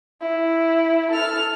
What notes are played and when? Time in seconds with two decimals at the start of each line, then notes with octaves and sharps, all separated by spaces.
0.21 E4
1.12 A4 F6